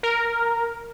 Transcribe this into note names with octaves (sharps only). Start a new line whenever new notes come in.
A#4